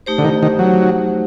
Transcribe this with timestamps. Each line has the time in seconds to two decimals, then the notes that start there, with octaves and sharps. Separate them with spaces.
0.06 A3 D#4 G4 C5
0.18 D3
0.24 D#3
0.43 D#3
0.59 F#3